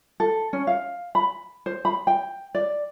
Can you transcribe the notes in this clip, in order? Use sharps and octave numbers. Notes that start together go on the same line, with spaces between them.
A4
C#4
F5
B5
C5
B5
G5
D5